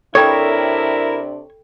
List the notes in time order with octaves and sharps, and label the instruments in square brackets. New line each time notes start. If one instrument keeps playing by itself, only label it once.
[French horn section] C3 D4 [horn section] E4 A#4 [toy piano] A4 G5 B5 [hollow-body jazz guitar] C#5